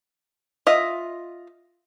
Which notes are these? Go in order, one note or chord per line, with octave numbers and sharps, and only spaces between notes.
F4 D#5 E5